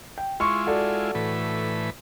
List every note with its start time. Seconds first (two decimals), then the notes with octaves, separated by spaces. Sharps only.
0.18 G5
0.40 G#3 E4 F4 C6 C#6
0.67 F#4 A4 D5
1.15 A2 E3 B4